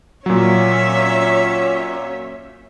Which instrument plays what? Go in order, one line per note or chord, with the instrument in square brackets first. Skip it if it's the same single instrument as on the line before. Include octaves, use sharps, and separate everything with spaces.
[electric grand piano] A#2 F#3 [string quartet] C#4 C#5 E5